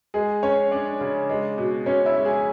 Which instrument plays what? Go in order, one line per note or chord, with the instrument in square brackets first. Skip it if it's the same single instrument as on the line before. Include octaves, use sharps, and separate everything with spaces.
[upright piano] G#3 G#4
C#4 C#5
C#4 D4 D5
C#3
G#3
B2
B2 C#4 C#5
E4 E5
G#3
G#4 G#5